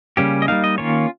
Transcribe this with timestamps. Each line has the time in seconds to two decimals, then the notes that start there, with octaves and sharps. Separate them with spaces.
0.17 C#3 G3 A#3 C#4 G4
0.42 D#5
0.48 G3 A#3 D#4 F5
0.64 D#5
0.78 D#3 A#3 C#4 F4 C#5